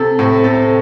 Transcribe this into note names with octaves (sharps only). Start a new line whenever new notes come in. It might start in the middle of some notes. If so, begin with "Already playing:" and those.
Already playing: C3 A4
A2 C4
C3 A4